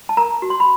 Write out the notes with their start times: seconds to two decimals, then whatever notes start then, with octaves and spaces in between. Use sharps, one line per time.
0.09 A5
0.17 A#4 A#5
0.42 F#4
0.50 C6
0.60 B5